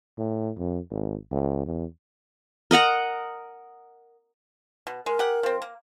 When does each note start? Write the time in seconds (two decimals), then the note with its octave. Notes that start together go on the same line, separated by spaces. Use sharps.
0.18 A2
0.58 F2
0.90 G#1
1.31 C#2
1.66 E2
2.71 A#4 D#5 F#5 A#5
4.87 B2
5.06 G#3 A#4
5.19 G4 G#4 F#5
5.43 F3 C4
5.62 A#3